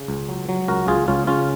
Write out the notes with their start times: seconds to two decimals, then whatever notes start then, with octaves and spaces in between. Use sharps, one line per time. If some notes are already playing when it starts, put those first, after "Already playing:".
Already playing: C#3
0.08 C#2
0.29 F#3
0.49 F#3
0.68 C#2 F#4 A#4
0.88 C#2 F4 G#4
1.08 C#2 C#4 F4
1.27 C#3 C#4 F4